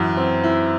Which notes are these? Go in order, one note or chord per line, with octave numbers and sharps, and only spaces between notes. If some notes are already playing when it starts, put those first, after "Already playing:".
Already playing: F#2 E3 E4
C4
E4